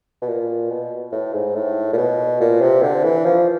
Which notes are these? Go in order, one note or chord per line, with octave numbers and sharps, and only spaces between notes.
B2
A#2
B2
A2
G#2
A2
A#2
B2
A#2
C3
D3
E3
F3